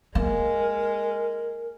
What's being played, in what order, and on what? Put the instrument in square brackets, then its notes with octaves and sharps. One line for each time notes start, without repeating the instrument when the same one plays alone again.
[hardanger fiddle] G#3 [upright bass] A#3 [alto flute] A#4